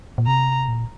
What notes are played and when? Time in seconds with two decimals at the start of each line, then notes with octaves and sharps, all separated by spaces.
0.18 A#2
0.27 C3 A#5
0.68 A#2